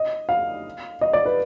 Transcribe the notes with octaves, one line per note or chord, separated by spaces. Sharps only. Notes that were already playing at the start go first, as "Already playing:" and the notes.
Already playing: D#5
F5
D#5
D5
B4